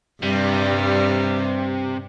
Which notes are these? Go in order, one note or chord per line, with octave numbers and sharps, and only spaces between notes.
G2 C3 G3